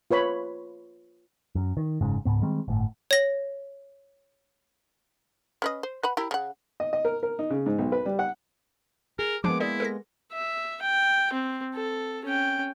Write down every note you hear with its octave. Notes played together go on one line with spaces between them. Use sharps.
F4 B4 C#5 B5
F#2
D#3
F#1 G#2 C#3
C#2 G#2 B3
D#3 G3 G#3 C4
G1 A2
C#5 A#6
C#4 B4 D#5
C5
B4 F#5 B5
E4 G4 A#4
C#3 F#5
D#5
D#5
A#4
A#4
D#4
C#3
G#2
B1
B4
G3
F#5
G#4 A#4
F3 G#3 A#3 B3 D4 D6
E4 G#4 D5
A4 A#4 A#6
E5
G5
C4
A4
C#4 G5